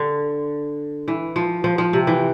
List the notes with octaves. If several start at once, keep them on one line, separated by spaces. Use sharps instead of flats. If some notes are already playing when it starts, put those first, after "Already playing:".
Already playing: D3
E3
F3
F3
F3
C3
E3